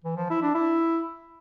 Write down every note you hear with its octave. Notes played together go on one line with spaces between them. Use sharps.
E3
F3
E4
D4
E4